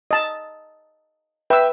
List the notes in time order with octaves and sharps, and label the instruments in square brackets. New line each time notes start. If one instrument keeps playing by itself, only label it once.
[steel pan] D#5 A5
[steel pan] B4 E6 [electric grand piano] E5 G5